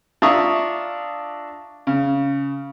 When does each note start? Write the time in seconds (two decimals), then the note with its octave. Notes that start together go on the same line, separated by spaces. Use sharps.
0.22 D4 F4 E5 A#5 C#6 D#6
1.87 C#3